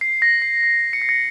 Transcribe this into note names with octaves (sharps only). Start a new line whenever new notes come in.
C7
A#6
C7
C7
C#7
C7
A#6 C#7